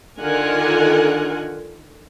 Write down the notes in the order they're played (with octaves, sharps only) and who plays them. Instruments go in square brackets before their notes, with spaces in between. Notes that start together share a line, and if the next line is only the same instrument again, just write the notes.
[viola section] D3 D#3 F4 A#4 F#5 G#5